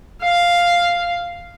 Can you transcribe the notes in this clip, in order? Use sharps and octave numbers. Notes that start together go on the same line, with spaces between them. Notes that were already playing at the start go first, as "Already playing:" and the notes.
F5